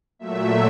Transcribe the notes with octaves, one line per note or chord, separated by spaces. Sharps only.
A#2 F#3 A3 E5